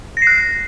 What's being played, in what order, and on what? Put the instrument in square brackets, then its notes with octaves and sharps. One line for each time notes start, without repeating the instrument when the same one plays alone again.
[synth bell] A#6
C7
F#6